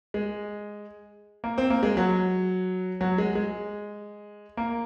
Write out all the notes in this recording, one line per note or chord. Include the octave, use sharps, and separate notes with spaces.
G#3
A#3
C4
A#3
G#3
F#3
F#3
G#3
G#3
A#3